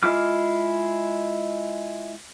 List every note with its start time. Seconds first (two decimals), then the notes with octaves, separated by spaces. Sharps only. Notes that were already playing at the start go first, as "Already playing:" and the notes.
0.03 G#3 E4 F4 D6 F6